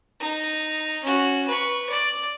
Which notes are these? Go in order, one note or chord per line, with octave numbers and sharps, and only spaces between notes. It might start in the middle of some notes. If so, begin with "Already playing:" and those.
D#4
C#4 F#4
B4 C#6
D5